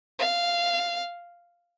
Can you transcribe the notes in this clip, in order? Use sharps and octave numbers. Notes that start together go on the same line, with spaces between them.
F5